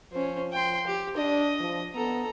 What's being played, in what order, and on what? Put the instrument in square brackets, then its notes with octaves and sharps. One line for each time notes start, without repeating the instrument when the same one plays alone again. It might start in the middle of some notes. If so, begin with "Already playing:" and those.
[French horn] F3 [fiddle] C#4 C5
[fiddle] G5 C6
G4
[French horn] D4 [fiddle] D#5
[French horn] F3
[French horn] B3 [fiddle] A4 A#5